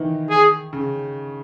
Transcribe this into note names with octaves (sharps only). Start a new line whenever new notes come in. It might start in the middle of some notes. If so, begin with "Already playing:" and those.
Already playing: D#3 E3 D#4
G#4
C#3